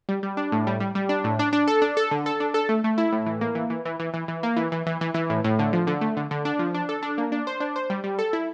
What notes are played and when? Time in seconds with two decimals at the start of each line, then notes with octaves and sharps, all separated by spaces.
0.09 G3
0.23 G3
0.37 D4
0.52 A2
0.67 G3
0.80 G3
0.95 G3
1.09 D4
1.24 A2
1.39 D4
1.53 D4
1.68 A4
1.82 D4
1.97 A4
2.11 D3
2.26 A4
2.40 D4
2.54 A4
2.69 A3
2.84 A3
2.98 E4
3.13 A2
3.26 E3
3.41 A#3
3.55 E3
3.70 E3
3.85 E3
4.00 E3
4.14 E3
4.28 E3
4.43 A#3
4.57 E3
4.72 E3
4.86 E3
5.01 E3
5.14 E3
5.30 A2
5.44 A2
5.59 D3
5.73 F3
5.87 D3
6.01 A3
6.17 D3
6.31 D3
6.45 D4
6.59 F3
6.74 D4
6.89 A4
7.03 D4
7.18 A#3
7.32 D4
7.47 C5
7.60 D4
7.76 C5
7.90 G3
8.04 G3
8.19 A4
8.33 E4